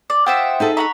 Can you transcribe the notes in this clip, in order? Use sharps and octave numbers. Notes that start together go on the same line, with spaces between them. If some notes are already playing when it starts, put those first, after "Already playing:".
D5
F4 C5 E5 F#5 G5 D#6
D#4 G#4 A4
E5 F#5 A#5 B5 C#6